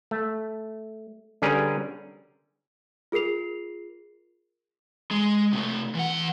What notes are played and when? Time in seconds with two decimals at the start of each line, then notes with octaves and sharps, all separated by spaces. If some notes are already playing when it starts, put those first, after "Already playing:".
0.11 A3
1.42 D3 G3 C#4 G#4 A#4 B4
3.12 F4 G#4 A#4 C7 F7
5.11 G#3
5.53 C3 A3
5.95 E3 F#5